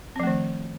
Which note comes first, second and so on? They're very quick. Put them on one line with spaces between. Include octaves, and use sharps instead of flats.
C4 F3 A3 D#3